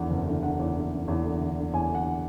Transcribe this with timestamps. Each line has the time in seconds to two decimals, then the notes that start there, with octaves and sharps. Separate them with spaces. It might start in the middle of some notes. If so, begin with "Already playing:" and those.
Already playing: E2 D3 F#5
0.10 F#1
0.27 D3
0.43 D3 F#5
0.59 E2
0.75 D3
0.91 F#1
1.08 E2
1.24 D3
1.41 D3
1.57 D3
1.73 E2 G#5
1.89 D3
1.95 F#5